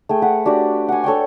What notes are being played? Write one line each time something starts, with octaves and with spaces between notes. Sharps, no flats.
A3 G#4 G5
B4 F#5
D4 F#4 G4 D5
F#5 G#5
A4 C#5 D5 G5